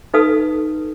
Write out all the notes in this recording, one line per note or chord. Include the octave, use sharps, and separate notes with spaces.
D#4 A4 B4 F5 A5 D#6